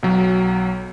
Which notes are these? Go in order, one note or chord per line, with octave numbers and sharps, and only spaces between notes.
B1 F#3